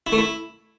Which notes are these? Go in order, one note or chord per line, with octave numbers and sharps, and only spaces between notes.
E4
A3
E4